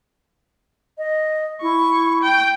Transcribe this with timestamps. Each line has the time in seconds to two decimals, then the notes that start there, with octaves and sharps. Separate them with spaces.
0.98 D#5
1.62 E4 C#6
2.23 G5